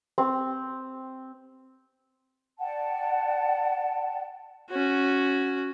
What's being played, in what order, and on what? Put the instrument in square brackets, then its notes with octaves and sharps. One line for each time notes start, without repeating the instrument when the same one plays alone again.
[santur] C4
[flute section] D5 F#5 G5 A5
[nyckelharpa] C#4 F#4